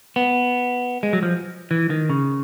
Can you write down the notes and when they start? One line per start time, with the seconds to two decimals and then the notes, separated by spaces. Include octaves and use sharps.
0.16 B3
1.03 G#3
1.13 F#3
1.23 F3
1.71 E3
1.90 D#3
2.10 C#3